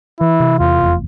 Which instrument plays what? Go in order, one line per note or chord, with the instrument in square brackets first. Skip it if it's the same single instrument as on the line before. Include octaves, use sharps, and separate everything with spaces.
[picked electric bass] E3 [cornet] E4
[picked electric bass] C3
[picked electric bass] E2 [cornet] F4
[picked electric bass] F1